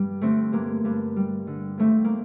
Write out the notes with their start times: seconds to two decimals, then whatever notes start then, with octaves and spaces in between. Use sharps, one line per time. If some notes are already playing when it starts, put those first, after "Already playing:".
Already playing: G2 G3
0.21 D3 A3 C4
0.53 G2 A#3
0.85 G2
1.16 G3
1.47 D3
1.78 D#2 A3 C4
2.04 A#3